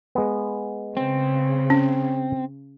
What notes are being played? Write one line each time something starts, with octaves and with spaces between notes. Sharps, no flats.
G#3 B3
C#3 C4
C#4